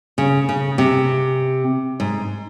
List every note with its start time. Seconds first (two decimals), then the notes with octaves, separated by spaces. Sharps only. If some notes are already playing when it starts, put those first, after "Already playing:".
0.18 C#3
0.49 C#3
0.78 C3
2.00 G#2